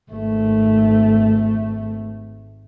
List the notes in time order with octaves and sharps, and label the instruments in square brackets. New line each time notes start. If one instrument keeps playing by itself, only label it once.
[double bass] G#1 A3